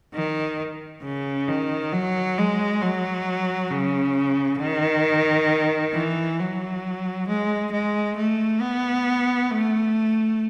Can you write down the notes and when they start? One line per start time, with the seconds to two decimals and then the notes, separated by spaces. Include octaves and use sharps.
0.14 D#3
1.03 C#3
1.48 D#3
1.92 F#3
2.38 G#3
2.81 F#3
3.71 C#3
4.60 D#3
5.94 E3
6.39 F#3
7.28 G#3
7.72 G#3
8.17 A3
8.61 B3
9.51 A3